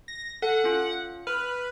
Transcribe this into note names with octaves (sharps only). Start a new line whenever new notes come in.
A#6
A4 F#5
C#4 F4
B4 F6